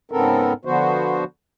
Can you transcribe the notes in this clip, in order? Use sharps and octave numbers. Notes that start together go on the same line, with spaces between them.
G#2 C#3 B3 C4 A4 A#4
D3 F3 B3 F#4 C5